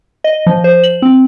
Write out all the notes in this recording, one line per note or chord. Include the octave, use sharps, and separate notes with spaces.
D#5
F3
C5
F#7
C4